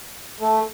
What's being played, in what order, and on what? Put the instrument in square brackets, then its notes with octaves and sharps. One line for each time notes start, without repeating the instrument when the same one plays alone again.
[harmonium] A3